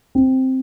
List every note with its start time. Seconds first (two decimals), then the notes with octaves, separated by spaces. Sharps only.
0.15 C4